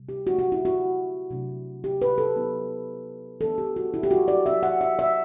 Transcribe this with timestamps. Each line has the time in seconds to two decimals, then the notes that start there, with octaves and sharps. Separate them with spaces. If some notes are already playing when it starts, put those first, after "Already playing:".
Already playing: C3 G3
0.09 G4
0.26 D3 A3 D4 F#4
0.39 F#4
0.52 E4
0.65 F#4
1.30 C3 F#3 A3 D4
1.84 G4
2.02 B4
2.18 A4
2.36 F#3 B3 E4
3.40 E3 B3 D4 A4
3.58 G4
3.76 F#4
3.94 E4
4.03 G4
4.11 F#4
4.28 D5
4.45 F#3 C4 E4 E5
4.63 F#5
4.81 E5
4.99 E5